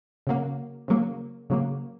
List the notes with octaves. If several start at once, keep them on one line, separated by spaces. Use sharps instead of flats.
C#3 F#3 A#3
C#3 F#3 A#3
C#3 F#3 A#3